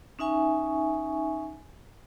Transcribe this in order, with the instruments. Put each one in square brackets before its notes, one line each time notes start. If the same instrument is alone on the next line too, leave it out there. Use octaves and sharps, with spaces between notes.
[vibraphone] C#4 D#4 E5 G#5 C#6